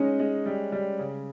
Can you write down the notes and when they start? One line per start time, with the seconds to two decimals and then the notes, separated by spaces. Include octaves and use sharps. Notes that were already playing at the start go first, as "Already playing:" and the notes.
Already playing: G#3 C#4 D#4
0.19 G#3
0.46 G3
0.72 G3
0.99 C#3